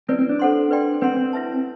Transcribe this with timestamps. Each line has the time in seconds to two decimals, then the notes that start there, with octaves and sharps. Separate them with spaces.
0.08 C4 E4 B4 D5
0.19 C4
0.29 D4
0.39 A4 C5 F#5 C6
0.71 B4 D5 G5 C6
1.01 C4 B4 F#5 C6
1.17 C4
1.33 E4 B4 E5 A5